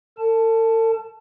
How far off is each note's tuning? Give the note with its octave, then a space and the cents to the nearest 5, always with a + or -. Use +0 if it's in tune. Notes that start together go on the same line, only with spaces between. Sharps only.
A4 +45 A5 +0